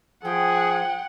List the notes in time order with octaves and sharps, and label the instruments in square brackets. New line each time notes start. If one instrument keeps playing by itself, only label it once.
[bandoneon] F3 [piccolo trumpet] G#4 [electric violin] F#5 [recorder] G5